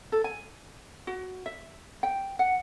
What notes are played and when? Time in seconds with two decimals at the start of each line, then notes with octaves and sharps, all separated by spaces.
0.12 A4
0.24 G#5
1.07 F#4
1.46 E5
2.03 G5
2.39 F#5